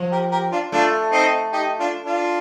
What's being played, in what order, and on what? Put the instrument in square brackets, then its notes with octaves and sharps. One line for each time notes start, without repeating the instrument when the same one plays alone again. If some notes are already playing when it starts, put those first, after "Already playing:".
Already playing: [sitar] F3
[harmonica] G4 A#4
G4 A#4
D4 F4
[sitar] A3 [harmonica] D4 F4
[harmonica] C4 D#4
D#4 G4
D4 F4
D4 F4